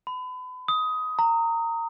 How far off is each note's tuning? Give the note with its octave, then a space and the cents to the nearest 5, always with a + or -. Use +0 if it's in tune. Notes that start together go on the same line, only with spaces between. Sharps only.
B5 +35
D#6 +15
A#5 -20